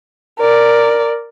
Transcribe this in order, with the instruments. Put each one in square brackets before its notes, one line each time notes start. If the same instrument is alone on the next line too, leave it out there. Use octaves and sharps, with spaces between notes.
[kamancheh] A#4 D5